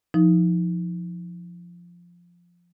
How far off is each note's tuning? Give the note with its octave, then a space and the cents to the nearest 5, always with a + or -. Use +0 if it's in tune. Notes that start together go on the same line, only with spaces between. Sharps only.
F3 +0 D#4 +25